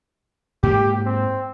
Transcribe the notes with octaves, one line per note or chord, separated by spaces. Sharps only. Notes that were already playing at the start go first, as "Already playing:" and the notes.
G#2 A#3 G4
C4